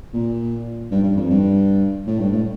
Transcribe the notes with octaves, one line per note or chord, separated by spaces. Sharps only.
A#2
G2
G2
F2
G2
A2
G2
A2